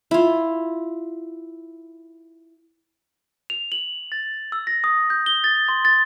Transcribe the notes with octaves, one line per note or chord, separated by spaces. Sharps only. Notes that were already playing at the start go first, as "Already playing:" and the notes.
E4 F4
F7
F#7
A6
E6
A#6
D#6
G6
G7
A6
C6
A6